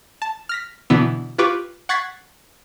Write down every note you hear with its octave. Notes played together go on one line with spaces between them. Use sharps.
A5
F6 A#6 B6
B2 D3 E3 B3 E6
F4 G4 B4 C#6 D6
F#5 C#6 G#6 A6 B6 C7